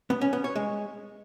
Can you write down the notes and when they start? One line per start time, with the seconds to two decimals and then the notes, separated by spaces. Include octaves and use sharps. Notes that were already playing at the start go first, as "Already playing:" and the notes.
0.10 B3
0.21 C#4
0.33 B3
0.44 C#5
0.56 G#3